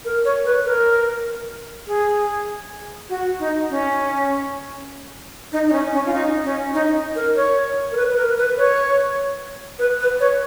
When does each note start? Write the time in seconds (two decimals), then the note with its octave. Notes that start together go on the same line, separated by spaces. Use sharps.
0.05 A#4
0.25 C#5
0.45 B4
0.65 A#4
1.87 G#4
3.10 F#4
3.40 D#4
3.70 C#4
5.53 D#4
5.68 D#4
5.72 C#4
5.93 C#4
6.06 F4
6.14 D#4
6.44 C#4
6.74 D#4
7.15 A#4
7.36 C#5
7.92 A#4
7.97 B4
8.09 B4
8.17 A#4
8.37 B4
8.58 C#5
9.79 B4
10.00 B4
10.20 C#5